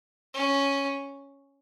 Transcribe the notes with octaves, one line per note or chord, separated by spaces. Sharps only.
C#4